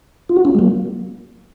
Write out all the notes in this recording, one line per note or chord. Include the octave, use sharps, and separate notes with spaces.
F4
F#4
C#4 F4
G#3
F#3 A#3